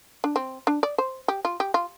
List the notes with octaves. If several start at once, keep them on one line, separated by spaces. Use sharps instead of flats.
D4
C4
D4
D5
C5
G4
F4
G4
F4